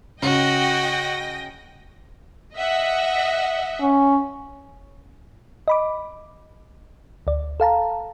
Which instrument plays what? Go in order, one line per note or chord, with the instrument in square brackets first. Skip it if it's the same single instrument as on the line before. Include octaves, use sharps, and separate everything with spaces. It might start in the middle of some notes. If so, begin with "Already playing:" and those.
[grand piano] C#3 [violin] F#4 [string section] D#5 G5 A#6
[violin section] D#5 E5 F#5
[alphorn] C#4
[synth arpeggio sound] D#5 B5 D6
D2 D5
A4 F5 A5 A#5